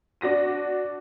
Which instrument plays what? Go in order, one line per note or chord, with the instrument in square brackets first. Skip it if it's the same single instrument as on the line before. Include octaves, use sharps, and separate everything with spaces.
[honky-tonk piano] D4 F#4 A#6 D#7